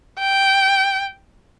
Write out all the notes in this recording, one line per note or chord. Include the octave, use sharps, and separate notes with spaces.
G5